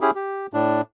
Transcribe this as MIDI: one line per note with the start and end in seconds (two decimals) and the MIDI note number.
0.01 0.11 61
0.01 0.11 64
0.01 0.11 67
0.01 0.11 68
0.15 0.47 67
0.53 0.81 45
0.53 0.81 62